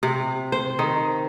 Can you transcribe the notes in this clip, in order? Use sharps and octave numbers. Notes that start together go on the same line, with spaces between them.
C3
C5
D#3